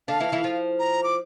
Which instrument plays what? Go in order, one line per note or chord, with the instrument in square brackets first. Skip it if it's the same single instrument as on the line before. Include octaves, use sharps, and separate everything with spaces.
[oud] D3 D4 [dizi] F5
[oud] E3 E4
E3 E4
F3 F4
[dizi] A#5
D6